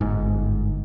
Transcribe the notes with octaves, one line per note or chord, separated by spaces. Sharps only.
G1 G#2